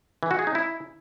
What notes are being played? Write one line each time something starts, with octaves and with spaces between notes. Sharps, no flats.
E3
F#4
G#4
D#4
E4